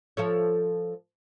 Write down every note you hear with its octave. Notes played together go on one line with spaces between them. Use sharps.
F3 A4 C#5